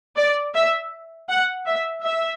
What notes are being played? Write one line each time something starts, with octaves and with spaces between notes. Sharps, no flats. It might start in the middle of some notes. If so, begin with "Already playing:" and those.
D5
E5
F#5
E5
E5